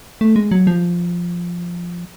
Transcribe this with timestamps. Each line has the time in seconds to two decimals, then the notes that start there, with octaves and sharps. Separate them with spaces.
0.21 A3
0.36 G#3
0.51 F#3
0.67 F3